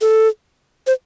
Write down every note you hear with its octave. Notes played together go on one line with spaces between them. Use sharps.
A4
C5